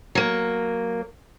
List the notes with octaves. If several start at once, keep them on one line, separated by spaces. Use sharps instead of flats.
F#3 A#3